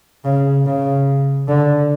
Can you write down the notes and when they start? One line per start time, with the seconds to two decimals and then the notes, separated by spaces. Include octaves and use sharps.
0.24 C#3
0.65 C#3
1.48 D3